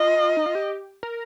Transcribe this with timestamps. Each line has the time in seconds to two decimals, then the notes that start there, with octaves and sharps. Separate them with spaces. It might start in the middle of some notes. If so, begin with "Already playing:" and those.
Already playing: F4 D#5
0.37 D#4
0.46 F4
0.55 G4
1.03 A#4